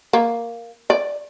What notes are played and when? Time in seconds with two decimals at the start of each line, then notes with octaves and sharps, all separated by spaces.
0.13 A#3
0.90 D5